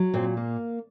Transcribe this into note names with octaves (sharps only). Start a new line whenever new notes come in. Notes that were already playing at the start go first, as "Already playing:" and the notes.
Already playing: F#3
A#2 C4
A#3